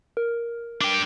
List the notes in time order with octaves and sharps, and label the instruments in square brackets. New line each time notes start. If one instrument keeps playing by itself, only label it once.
[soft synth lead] A#4
[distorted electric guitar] D4 G5